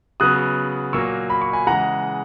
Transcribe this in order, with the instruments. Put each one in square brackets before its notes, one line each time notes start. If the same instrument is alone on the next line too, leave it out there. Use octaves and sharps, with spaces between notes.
[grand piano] C#3 F#3 B3 D#6 F#6
A#2 F#3 A#3 C#6 E6
B5
C#6
G#5 B5
C#3 E3 G#3 F#5 A#5